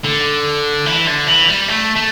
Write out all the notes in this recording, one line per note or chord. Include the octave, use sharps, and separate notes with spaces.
D3
E3
D3
E3
G3
A3
A3